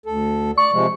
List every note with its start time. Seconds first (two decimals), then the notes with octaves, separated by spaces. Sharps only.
0.06 D2 A4
0.58 D5 C#6
0.72 C3 F3 G#3